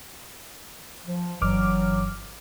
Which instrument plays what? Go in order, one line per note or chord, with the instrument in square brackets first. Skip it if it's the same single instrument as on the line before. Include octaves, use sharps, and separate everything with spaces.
[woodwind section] F3
[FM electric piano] G1 D6 F6 [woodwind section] G2 E3 F#3